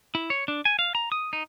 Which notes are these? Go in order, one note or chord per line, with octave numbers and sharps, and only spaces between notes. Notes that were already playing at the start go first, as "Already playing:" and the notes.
E4
C#5
D4
G#5
F5
A#5
D#6
D#4